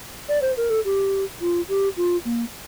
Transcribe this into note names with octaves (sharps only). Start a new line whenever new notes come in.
D5
C5
A#4
A4
G4
F4
G4
F4
A#3